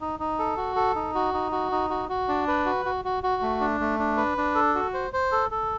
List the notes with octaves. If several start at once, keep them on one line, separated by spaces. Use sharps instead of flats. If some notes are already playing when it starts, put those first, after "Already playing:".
D#4
D#4
A4
F#4
A4
D#4
F#4
D#4
F#4
D#4
F#4
F#4
D4
B4
F#4
F#4
F#4
F#4
A3
D4
A3
D4
B4
D4
A4
F#4
C5
C5
A4
A4